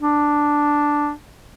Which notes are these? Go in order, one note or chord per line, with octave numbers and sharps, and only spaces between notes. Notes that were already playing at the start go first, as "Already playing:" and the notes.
D4